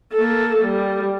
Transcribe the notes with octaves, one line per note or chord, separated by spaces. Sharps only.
A#3 A4
G3